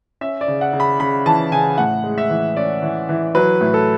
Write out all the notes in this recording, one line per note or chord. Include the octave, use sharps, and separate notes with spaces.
C#4 E5
D5
C#3
F#5
C#3
B5
C#3 B5
E3 A5
C#3 G#5
A2 F#5
G#3
E5
E3
C#4 D5
E3
E3
F#3 B4
A2
A4